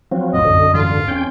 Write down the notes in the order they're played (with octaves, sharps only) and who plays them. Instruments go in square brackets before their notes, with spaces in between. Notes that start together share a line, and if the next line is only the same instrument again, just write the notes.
[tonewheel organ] F3 F#3 [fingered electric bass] C4
[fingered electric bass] B1 F2 A2 [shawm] D#5
[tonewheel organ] F#2 D3
[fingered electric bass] G#2 E3 G3 [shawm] F4
[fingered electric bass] G#2
[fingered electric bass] E2 C4 [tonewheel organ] C#4 G5